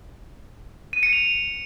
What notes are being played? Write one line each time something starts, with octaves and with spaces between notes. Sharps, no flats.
D#7
C#7
F7